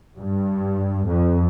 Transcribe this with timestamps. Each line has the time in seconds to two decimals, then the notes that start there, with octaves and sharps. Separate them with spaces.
0.18 G2
1.09 F2